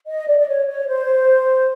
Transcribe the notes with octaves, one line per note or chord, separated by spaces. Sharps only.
D#5
D5
D5
C#5
C#5
C5